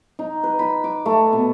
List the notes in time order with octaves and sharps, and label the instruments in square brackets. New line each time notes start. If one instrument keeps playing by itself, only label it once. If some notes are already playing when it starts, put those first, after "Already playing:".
[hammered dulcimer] D#4
B4
B5
D6
A3
B2